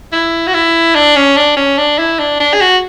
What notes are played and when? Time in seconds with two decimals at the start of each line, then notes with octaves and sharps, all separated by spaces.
0.12 E4
0.47 F#4
0.54 E4
0.95 D4
1.16 C#4
1.36 D4
1.57 C#4
1.78 D4
1.98 E4
2.19 D4
2.40 D4
2.53 G#4
2.61 F#4